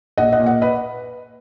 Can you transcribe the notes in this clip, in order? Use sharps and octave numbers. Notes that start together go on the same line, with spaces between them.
A#1 D#5 F#5
D#5 F#5
A#2
D#5 F#5
B4 D#5